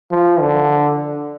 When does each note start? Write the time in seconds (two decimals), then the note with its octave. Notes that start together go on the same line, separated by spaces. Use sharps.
0.11 F3
0.41 D3